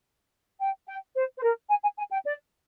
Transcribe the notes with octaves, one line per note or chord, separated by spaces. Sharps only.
G5
G5
C5
C5
A#4
G#5
G#5
G#5
G5
D5